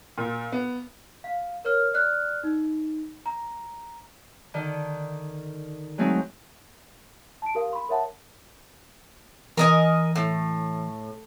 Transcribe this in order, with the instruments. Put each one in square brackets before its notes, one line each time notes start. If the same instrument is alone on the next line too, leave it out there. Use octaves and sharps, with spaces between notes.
[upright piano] A#2
B3
[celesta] F5
A#4 C#5 F6
D5 F6 F#6
D#4
A#5
[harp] D3 D#3
F#3 G#3 A3 C4 D#4
[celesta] A5 D7
G4 A#4 F5
B5 C6
A#4 C#5 E5 F#5 A5
[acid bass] E3 [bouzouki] A#4 D#5 G#5
[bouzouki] A2